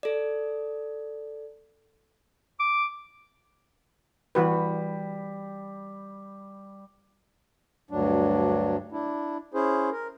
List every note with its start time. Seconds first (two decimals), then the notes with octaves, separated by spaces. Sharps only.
0.03 A4 D5
2.60 D6
4.35 E3 G3 F#4 B4
7.91 D2 G2 F#3 D4
8.92 D4 E4
9.54 C#4 E4 G#4 C5
9.92 A#4